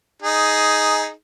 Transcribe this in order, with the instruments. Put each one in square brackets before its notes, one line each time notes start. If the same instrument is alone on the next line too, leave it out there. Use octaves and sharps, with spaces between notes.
[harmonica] D#4 G#4